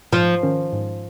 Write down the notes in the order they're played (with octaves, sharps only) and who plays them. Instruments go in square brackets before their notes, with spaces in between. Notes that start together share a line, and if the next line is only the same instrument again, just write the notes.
[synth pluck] G#2 [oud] F3
[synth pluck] D#3 C#4 A#4
G#2